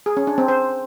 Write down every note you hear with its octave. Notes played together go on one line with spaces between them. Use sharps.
G#4
C#4
D4
C4
C5